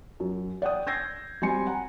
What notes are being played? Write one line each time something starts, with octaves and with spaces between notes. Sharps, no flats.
F#2
D5 F#5 G5 D#6
E6 G6 G#6 A#6 C7
G3 C4 F#4 G#5 C6 C#7
F#5 G#5 A#5